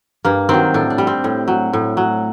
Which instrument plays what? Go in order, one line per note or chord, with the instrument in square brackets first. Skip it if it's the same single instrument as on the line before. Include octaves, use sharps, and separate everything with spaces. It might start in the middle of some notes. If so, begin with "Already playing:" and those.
[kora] G2 A#3
D#3 F#3 C4
A2 D4
D4
G3
C4
A2
F#3
A2
F#3